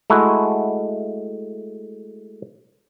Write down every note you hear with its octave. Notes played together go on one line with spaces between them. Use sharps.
G#3 A3 E4 F#4